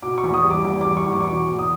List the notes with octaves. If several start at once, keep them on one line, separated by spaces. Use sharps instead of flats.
B2 D6
C#6
E2
D#6
G3
D6
E2 D6
D6
G3
C#6
E2
D6
C#6
B2 D6
E2
D#6